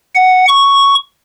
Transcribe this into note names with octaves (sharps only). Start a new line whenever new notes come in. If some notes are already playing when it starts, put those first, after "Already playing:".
F#5
C#6